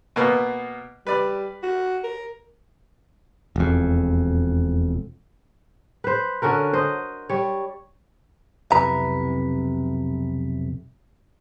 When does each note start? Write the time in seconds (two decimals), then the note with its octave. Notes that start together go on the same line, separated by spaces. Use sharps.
0.16 B2 A#3 B3
1.07 G3 B4 D5
1.63 F#4
2.04 A#4
3.56 E1 F2
6.04 B4 C5
6.42 D3 C#4 F#4 A#4
6.73 C5 D#5
7.29 G3 C#5
8.72 B1 F2 C3 E4 B4 A#5